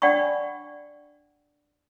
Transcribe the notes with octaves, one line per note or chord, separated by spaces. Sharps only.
D4 D5 F#5 G5 B5 C#6